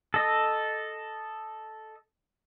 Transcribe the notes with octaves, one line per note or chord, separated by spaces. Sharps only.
A4 D#5